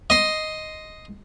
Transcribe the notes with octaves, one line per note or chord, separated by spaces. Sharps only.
D#5 C6